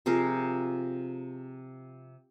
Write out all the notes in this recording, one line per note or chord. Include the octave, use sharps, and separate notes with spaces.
C3 F3 G#4 A#4